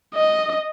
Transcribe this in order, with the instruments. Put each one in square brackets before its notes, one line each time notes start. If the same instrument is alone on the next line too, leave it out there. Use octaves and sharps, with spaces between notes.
[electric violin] D#5